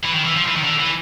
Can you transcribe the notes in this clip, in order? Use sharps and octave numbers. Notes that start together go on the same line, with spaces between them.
E3
D#3
E3
F3
E3
D#3
D3
E3